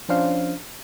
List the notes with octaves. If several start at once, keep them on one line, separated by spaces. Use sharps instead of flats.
F3 C#4 D4 C5 F5